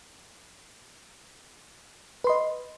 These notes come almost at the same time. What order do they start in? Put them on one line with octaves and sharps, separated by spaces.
B4 C6 D#5